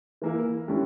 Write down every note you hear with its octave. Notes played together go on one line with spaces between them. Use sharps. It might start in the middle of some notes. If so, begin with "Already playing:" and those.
E3 A#3 E4 A#4
D3 G3 C#4 E4